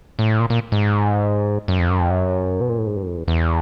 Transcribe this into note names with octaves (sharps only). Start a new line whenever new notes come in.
A2
A#2
A#2
G#2
F#2
F2
F#2
F2
F#2
B2
A#2
A2
G#2
G2
F#2
F2
E2
E2